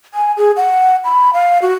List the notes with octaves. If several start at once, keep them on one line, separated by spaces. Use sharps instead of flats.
G#5
G#4
F#5
B5
F5
F#4